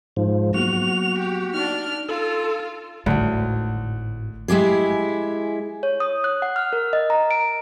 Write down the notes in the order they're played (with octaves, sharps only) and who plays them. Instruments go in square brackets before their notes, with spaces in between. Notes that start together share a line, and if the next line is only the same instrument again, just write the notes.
[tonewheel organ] G#2 F3
[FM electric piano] F#3 A#3 B3 [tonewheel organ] F#4 [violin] F7
[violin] G4
[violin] D4 F6 [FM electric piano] D#4
[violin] F4 [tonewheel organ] A4
[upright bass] G#1 A2 [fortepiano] D2
[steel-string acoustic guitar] G#3 E4 G4 G#4
[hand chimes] C#5
D#6
F#6
F#5
F6
A#4
D#5
A#5
D7